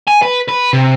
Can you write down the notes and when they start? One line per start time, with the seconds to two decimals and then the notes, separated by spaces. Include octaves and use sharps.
0.08 G#5
0.23 B4
0.49 B4
0.73 C3